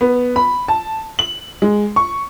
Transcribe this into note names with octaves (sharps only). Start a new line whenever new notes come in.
B3
B5
A5
F#7
G#3
C#6